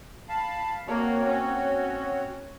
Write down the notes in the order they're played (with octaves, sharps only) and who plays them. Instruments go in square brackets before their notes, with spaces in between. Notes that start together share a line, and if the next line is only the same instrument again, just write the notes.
[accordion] F5 A5 B5
[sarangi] A#3 [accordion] C4 F#4 C#5
[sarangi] C#4